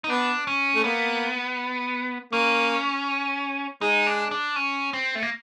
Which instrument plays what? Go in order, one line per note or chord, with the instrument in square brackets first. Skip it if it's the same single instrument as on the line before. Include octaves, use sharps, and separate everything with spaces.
[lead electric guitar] D#4
[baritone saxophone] B3 [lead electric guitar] D4
[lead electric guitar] C#4
[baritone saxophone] A3
[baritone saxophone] A#3 [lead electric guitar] B3
[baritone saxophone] A#3 [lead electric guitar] C#4
[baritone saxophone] G#3 [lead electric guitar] D#4
[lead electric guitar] D4
D4
C#4
C4
A3
A#3